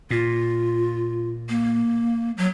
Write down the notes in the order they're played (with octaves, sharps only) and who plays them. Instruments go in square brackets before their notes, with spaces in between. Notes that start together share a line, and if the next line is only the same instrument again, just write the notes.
[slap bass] A#2 [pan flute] F4
[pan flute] A#3
F#3